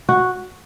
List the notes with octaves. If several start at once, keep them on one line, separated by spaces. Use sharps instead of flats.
F#4